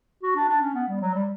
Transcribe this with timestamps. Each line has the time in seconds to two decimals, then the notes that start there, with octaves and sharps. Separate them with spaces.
0.23 F#4
0.36 D4
0.49 D4
0.62 C#4
0.75 B3
0.88 G3
1.01 F#3
1.14 G3